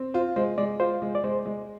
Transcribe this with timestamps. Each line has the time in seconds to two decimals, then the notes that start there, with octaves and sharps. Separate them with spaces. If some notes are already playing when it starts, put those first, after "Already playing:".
Already playing: C4
0.14 F4 C5
0.36 G#3 C5
0.58 G#3 D5
0.80 F4 C5
1.02 G#3
1.15 D5
1.24 G#3 C5
1.46 G#3